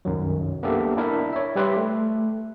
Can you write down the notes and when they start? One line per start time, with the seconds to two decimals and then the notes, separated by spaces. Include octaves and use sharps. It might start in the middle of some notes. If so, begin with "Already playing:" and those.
0.05 C2 F#2 D#3 F#3
0.63 A#3 B3 D4 G4 A4 E5
0.97 D4 E4 A#4 D5 E5
1.33 C#5 E5
1.56 G3 G4 B4 E5 C6
1.77 A3